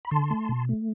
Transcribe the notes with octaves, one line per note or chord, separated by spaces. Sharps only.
B5
D3 A5 C6
A3
B2
A3